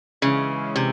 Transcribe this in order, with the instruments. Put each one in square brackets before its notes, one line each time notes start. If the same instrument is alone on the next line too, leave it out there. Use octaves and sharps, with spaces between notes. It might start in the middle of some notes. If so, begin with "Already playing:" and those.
[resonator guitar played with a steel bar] C#3 [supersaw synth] E3 G#3 C#4 E4
[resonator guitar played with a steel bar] C3